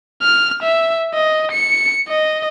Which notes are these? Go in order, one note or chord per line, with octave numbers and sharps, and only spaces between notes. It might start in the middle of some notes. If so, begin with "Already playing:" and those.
F6
E5
D#5
C#7
D#5